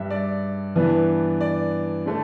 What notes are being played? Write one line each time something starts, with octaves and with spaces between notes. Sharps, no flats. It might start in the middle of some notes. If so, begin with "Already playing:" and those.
Already playing: G2 G3 D4 E5
D5
G2 E3 B3 D4
D5
D3 A3